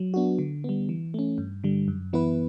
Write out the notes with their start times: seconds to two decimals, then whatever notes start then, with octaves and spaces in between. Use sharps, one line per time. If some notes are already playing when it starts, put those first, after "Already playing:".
Already playing: F#3
0.14 B3 D4 F#4
0.39 D3
0.64 G3 B3
0.89 E3
1.14 A3 C#4
1.38 G2
1.64 D3 G3
1.88 F#2
2.13 E3 B3 E4 B4